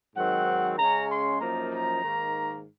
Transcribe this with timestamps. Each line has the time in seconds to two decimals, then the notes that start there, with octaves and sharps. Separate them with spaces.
0.15 G#2 D#3 F#3 C4 F#5
0.78 C#3 G#3 C#4 A#5
1.09 C6
1.40 F#2 F3 A#3 D#4 A#5
1.72 A#5
2.03 G#2 D#3 A#3